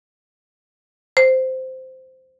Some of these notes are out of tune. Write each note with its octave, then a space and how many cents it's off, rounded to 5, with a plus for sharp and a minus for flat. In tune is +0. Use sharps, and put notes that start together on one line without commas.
C5 -10